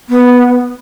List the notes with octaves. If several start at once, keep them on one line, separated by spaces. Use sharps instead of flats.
B3